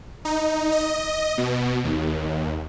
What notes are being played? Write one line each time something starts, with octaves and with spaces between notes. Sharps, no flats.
D#4
D#5
B2
D#2